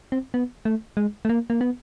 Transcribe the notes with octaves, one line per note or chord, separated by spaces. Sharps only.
C4
B3
A3
G#3
A3
A#3
A#3
B3